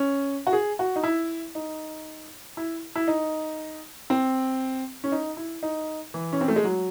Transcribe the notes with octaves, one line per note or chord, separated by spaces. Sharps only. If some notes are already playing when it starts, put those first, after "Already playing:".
Already playing: C#4
F#4
G#4
F#4
D#4
E4
D#4
E4
E4
D#4
C4
C#4
D#4
E4
D#4
E3
C#4
C4
A3
G#3
F#3